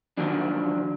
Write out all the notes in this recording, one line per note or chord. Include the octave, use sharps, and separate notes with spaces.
D2 D#3 F3 F#3 D4